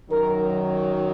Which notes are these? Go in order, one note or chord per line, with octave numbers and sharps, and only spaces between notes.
F#2 D#3 F#3 A#4